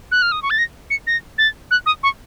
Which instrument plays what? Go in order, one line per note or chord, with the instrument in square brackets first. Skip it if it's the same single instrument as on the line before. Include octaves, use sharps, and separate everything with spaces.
[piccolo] F#6
F6
D#6
C#6
A6
A#6
C#7
A#6
A6
F#6
D#6
C#6